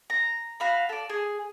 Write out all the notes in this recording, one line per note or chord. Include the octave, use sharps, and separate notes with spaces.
A#5
F#4 F5 B5
A4 D5
G#4